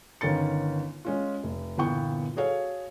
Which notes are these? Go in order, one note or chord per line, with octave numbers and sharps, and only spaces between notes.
G1 D#3 C#4 A6 C#7
G#3 C#4 F4
F1
G1 A#2 E3 B3 G5 C#6
F#4 G#4 A4 C#5 F5